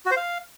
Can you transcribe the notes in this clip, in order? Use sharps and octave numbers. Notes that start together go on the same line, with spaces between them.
F#4
C5
F5